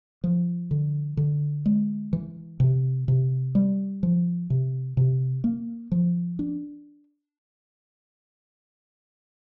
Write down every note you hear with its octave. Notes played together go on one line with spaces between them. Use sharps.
F3
D3
D3
G#3
E3
C3
C3
G3
F3
C3
C3
A#3
F3
D4